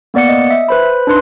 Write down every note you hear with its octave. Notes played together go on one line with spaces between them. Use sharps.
A#3 B3 D5 F#5 C#7
D#5
E5
B4 C5 B5
D4 D#4 B4 C6